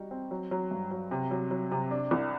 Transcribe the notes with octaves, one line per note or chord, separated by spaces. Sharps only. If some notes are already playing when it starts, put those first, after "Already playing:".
Already playing: G3 D#4 F#4
C4
F#3
F#3
G2
F#3
C3
F#3
F#3
C3
D4
C2